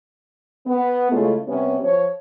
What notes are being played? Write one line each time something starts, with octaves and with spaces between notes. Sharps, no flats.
B3
C#3 G#3 A3 C#4 E4 F4
C3 G3 B3 C#4
F3 C#5